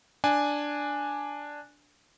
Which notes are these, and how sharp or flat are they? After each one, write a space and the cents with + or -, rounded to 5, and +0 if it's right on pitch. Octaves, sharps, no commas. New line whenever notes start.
D4 +0 G#5 +0